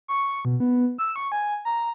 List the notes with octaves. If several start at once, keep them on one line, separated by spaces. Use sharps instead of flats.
C#6
B2
B3
E6
C#6
G#5
A#5